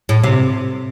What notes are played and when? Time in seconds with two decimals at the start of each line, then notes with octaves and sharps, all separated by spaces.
0.09 A2
0.24 C3